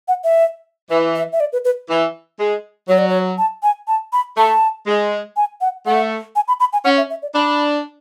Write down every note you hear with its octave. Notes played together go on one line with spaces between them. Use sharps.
F#5
E5
E3 E5
E5
E5
D5
B4
B4
E3
G#3
F#3 C#5
D5
C#5
A5
G#5
A5
B5
A3 A5
G#3
G#5
F#5
A3 F#5
G#5
B5
B5
G#5
C#4 F#5
E5
E5
D5
D4 B5